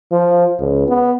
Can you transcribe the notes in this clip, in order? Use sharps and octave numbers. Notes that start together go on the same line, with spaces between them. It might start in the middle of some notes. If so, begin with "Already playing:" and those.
F3
C#2
B3